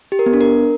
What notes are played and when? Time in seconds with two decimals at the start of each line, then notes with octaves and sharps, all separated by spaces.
0.12 G4
0.19 A#4
0.26 B3
0.33 D4
0.41 A#4